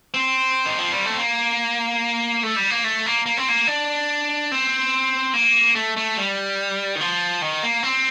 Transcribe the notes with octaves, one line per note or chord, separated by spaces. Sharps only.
C4
D#3
F3
G3
A3
A#3
A3
G3
A#3
A3
A#3
A#3
C4
A#3
D4
C4
A#3
A3
A3
G3
D#3
F3
D#3
A#3
C4